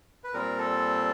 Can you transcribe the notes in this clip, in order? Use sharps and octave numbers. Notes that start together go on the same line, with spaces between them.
B4
A#2 G3 C4 A#4
A4